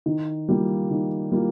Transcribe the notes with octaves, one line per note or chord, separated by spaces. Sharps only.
D#3
G3 A#3 F4
D#3
G3 A#3 F4